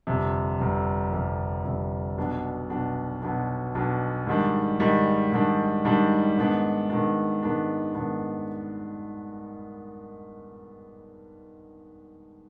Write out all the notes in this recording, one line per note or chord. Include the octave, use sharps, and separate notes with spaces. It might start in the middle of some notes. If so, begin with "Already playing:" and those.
G1 F2 C3
G1 F2 C3
G1 F2 C3
G1 F2 C3
B1 B2 B3 D4
B1 B2 B3 D4
B1 B2 B3 D4
B1 B2 B3 D4
G#2 D#3 G3 D4
G#2 D#3 G3 D4
G#2 D#3 G3 D4
G#2 D#3 G3 D4
G#2 D#3 B3 D4
G#2 D#3 B3 D4
G#2 D#3 B3 D4
G#2 D#3 B3 D4